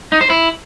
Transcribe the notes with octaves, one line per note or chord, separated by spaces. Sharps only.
D#4
C5
E4